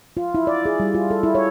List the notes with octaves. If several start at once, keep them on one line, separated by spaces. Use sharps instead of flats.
F4
E4
D5
G#4
G3
F4
A4
E4
C#5